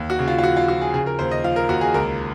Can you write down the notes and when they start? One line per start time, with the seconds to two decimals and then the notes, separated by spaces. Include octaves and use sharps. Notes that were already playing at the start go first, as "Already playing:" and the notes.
Already playing: D#2
0.10 F#4
0.19 C#3
0.28 F4
0.38 F4
0.43 F3 F#4
0.57 F4
0.68 F3 F#4
0.81 G#4
0.94 C#3 G#4
1.06 A#4
1.19 D#2 C5
1.31 D#5
1.44 F3 F5
1.56 A#4
1.69 D#2 F#4
1.81 G#4
1.94 C#2 A#4